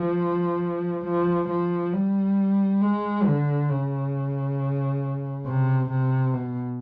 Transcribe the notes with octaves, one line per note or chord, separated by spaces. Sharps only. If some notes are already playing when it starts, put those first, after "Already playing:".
Already playing: F3
F3
F3
G3
G#3
D3
C#3
C3
C3
B2